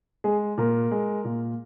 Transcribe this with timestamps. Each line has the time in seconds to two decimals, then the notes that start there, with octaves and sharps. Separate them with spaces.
0.24 G#3 G#4
0.58 A#2 A#4
0.91 G#3
1.25 A#2